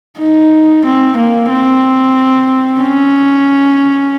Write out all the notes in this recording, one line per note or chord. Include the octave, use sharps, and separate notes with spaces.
D#4
C4
A#3
C4
C#4